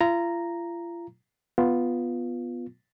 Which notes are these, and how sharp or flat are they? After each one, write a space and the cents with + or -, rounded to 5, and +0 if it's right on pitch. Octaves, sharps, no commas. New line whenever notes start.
F4 -40 A#5 +0
B3 +0 F4 +0